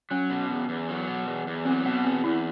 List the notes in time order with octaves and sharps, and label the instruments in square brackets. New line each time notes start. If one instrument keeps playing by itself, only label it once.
[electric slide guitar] F#3 [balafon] C#4
[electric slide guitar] B2
E2
E2
F#3
B2
E2
E2
[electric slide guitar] F#3 [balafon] C4
[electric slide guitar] B2 [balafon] B3
[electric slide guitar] E2 [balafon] C4
[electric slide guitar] E2 [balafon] E4